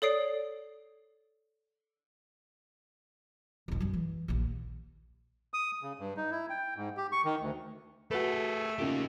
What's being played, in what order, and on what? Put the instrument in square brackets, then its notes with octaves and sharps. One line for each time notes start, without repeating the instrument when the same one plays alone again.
[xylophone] A4 C#5 D5 D#6 C7 D7
[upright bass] E1 B1
F#2 G3
E3
A#1 D#2
[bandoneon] D#6
C#3
G2
D#4
E4
G5
G#2
G4
C#6
D#3
D2
[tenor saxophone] A3 [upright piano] F#4 B4 [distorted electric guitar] G#4 A4
[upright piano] A#2 C#3 [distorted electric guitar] D#4 G4